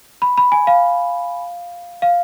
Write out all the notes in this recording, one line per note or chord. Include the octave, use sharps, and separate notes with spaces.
B5
B5
G#5
F5
F5